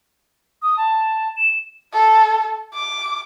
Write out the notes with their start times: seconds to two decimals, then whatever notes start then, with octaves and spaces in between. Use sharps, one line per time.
0.62 D#6
0.77 A5
1.36 E7
1.93 A4
2.74 D6